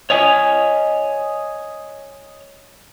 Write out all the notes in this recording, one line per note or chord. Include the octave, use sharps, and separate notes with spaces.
C#5 D#5 G#5